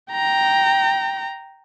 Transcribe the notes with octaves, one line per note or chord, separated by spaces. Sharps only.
G5 A#5